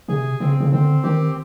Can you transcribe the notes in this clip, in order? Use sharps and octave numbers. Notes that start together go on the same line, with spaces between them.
C3 G#4
C#3 C4
C#3
D3 C4
D#3 G4